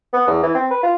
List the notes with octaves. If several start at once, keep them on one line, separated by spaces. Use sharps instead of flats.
B3
E2
E3
C4
B4
F4